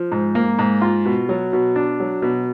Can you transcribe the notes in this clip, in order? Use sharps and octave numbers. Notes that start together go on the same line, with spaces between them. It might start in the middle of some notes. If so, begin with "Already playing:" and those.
Already playing: F3
G#2
A#3
G#2
F4
B2
F#3
B2
D4
F#3
B2